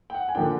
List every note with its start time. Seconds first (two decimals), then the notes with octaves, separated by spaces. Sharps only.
0.10 G5
0.14 F#5
0.29 G#5
0.35 D3 F3 A#3 D4 G5